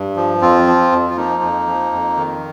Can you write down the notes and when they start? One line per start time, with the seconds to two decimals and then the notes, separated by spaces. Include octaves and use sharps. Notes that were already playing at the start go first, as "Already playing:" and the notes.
Already playing: G2
0.16 F3
0.42 F2 C4 F4
0.67 F3
0.92 F2
1.10 F4
1.17 F3 A#3 D#4
1.42 F2
1.67 F3
1.92 F2
2.17 D#3